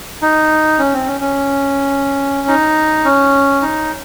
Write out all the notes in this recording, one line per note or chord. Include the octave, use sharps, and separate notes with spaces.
D#4
C#4
C4
C#4
C#4
D#4
C#4
D#4